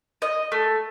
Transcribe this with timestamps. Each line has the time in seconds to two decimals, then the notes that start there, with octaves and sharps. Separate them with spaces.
0.22 D#5
0.52 A3